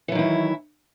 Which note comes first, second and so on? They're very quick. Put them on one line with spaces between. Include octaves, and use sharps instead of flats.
E3 F#3 D#3 E4